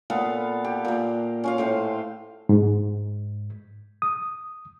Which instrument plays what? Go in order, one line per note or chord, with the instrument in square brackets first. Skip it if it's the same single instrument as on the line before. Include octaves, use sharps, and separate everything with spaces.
[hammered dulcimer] A#2 B3 A4 F5
G4
A#2 A#3
C#4 F4 F5
A2 C5 C6
[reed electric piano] G#2
D#6